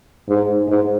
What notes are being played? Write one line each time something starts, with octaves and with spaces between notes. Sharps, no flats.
G#2
G#2